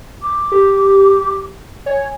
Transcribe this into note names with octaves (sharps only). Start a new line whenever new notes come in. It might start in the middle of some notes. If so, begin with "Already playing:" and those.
D6
G4
C#5 G#5